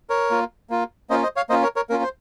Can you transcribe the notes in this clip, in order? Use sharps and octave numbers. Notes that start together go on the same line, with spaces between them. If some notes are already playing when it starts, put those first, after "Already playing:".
A#4 C#5
A#3 F4
A#3 F4
A#3 C#4 F4 C5 D#5
C5 D#5
C#5 F5
A#3 C#4 F4 C5 D#5
A#4 C#5
A#4 C#5
A#3 C#4 F4 A#4
C5